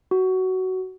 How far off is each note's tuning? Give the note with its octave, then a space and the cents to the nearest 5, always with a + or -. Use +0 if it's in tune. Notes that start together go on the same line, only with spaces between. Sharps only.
F#4 +15